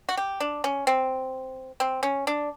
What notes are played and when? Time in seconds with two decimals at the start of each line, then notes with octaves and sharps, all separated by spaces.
0.09 F#4
0.17 G4
0.40 D4
0.64 C#4
0.87 C4
1.80 C4
2.03 C#4
2.27 D4